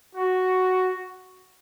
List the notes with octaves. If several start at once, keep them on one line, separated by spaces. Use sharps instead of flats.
F#4